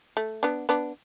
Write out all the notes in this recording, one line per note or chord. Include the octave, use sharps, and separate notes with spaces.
A3
B3 D4
B3 D4